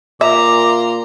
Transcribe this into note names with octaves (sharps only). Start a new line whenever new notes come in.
A#2 E5 A#5 C6 D6